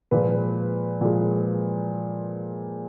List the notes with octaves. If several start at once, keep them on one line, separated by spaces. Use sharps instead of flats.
A#2 F3 G#3 B4
A#2 F3 G#3